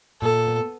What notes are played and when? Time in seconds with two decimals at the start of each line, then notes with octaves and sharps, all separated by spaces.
0.22 A#2 A4
0.48 B3